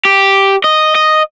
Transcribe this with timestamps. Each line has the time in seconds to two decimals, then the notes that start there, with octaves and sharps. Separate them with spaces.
0.05 G4
0.64 D#5
0.95 D#5